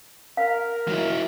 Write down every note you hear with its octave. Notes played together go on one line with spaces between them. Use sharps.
A#4 F5
F#3 E4